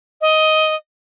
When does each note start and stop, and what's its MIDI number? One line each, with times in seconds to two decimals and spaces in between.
0.21 0.75 75